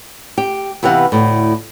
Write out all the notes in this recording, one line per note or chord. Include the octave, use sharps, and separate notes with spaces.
G4
C3 E3 B3 G4 F5 F#5
D2 A2